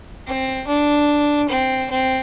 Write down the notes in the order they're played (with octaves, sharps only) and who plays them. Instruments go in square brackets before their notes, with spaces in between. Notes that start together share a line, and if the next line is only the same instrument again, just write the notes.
[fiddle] C4
D4
C4
C4